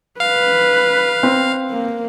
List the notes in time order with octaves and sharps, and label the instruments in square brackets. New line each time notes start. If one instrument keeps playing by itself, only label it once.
[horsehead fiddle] B4 [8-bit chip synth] F5
[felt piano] C4
[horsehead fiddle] A#3